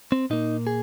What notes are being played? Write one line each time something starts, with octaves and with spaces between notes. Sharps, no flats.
C4
A#2 A#3 D#4
G#4